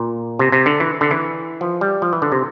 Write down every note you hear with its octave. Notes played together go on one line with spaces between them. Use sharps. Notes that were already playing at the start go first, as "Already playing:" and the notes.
Already playing: A#2
C3
C3
D3
E3
D3
E3
F3
G3
F3
E3
D3
C3